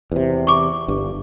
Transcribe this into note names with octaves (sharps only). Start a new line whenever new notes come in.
E2 C3
C#6 D6
G1 G2